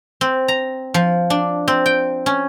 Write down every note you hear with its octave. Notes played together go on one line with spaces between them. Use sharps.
C4
A#5
F3
D4
C4
G5
C#4